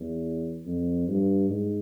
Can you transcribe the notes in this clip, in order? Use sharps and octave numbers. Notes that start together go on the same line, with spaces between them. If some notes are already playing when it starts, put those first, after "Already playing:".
Already playing: E2
F2
G2
G#2